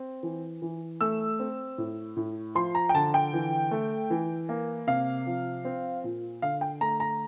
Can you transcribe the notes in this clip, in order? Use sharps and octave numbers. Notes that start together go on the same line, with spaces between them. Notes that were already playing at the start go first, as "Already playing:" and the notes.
Already playing: C4
E3
E3
A3 E6
C4
A2
A2
F3 C6
A#5
G5
D3 A5
G5
E3
A3
E3
A#3
C3 F5
F3
C4
A#2
D3 F5
G5
A3 A#5
A#5